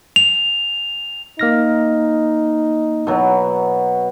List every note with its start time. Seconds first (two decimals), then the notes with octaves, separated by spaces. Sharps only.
0.16 F7
1.39 A#3 D#4 F6 A#6
3.07 B2 F#3